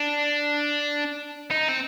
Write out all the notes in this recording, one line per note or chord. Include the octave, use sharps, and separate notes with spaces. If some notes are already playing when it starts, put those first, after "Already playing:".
Already playing: D4
D#4
C4